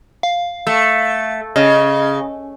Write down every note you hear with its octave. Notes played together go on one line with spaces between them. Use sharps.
F5
A3
C#3 D#5